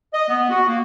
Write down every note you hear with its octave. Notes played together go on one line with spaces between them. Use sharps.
D#5
B3
F#4
A#3